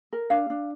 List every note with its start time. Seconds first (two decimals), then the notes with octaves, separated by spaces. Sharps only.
0.13 A#4
0.30 D4 F5
0.50 D4